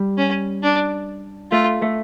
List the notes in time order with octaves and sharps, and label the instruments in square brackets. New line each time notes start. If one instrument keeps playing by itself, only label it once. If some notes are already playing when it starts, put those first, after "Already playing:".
Already playing: [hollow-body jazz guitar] G3
[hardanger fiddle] C#4
D4
[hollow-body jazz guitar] A3 [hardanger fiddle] F4
[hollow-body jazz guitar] A3